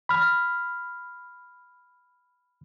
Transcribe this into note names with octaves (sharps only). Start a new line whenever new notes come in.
B5 F6